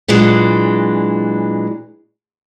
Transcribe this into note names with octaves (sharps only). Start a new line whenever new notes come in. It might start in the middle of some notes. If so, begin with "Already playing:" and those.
A#2 E3 F#3 G#3 D4